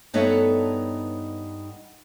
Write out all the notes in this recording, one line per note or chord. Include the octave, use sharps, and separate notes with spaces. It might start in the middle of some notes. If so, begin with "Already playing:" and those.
G2 B3 D#4 A4 C#5 E5